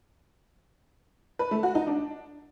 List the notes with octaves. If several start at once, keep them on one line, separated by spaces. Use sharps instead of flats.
B4
A3
F#4
D#4
D4